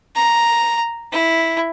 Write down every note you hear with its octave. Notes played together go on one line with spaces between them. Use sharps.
A#5
E4